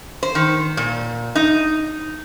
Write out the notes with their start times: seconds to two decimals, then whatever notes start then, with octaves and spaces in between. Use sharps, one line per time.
0.23 C5
0.35 D#3
0.77 A#2
1.35 D#4